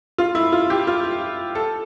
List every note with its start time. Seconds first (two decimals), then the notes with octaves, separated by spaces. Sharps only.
0.18 F4
0.35 E4
0.52 F4
0.70 G4
0.87 F4
1.55 A4